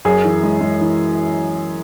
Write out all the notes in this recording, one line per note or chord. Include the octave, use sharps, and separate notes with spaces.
F#2 G#4
E3
G#3
G#3
E3